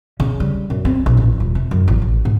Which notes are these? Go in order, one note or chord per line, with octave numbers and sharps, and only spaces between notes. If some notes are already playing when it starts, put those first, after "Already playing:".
C#3
G3
F#2
C4
A#1
A1
D#1
C3
F#2
A1
A1
G#2